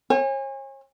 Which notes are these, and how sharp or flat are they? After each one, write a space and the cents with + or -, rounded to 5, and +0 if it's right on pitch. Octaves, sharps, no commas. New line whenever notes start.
C#5 -40 G#5 -30